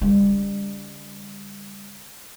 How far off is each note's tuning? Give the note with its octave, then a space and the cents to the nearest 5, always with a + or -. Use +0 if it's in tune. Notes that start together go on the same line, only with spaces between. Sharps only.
D3 -45 G3 +30